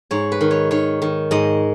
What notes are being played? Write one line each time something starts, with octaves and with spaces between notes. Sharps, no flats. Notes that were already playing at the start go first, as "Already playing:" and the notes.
G#2 C#5
B4
D#3
C#5
D#3 C#5
D#3
G#2 D#5